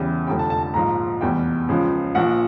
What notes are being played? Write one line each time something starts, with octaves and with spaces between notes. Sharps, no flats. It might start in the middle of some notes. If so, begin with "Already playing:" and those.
Already playing: E2 C#3 E3 G3
F1 F2 D3 G3 G5
A5
A5
A5
A#1 G#2 F3 A#5
F1 E2 B2 G3 G5
C#2 C#3 F3
A#1 A#2 F3 F#5